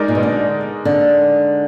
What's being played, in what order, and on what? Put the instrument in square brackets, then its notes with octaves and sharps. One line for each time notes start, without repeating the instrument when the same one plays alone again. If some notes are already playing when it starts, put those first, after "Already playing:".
Already playing: [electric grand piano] G#3 D#4 A#4 D5
[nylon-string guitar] A#2
B2
D3
D3